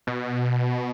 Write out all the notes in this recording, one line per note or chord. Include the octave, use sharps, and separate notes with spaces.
B2